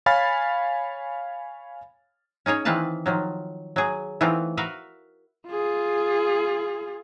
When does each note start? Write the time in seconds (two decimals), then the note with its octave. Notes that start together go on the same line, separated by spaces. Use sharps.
0.06 C#5 F5 G#5 B5 F6 A6
2.46 C#4 D#4 G#4 C#5
2.65 D#3 E3 C4 B4 F5 A5
3.06 D#3 F3 F#3
3.76 F#3 G#4
4.21 E3 A3 B3 C4 D#4 F4
4.57 F#4 A#4 B4 E5 F5
5.48 F4 G#4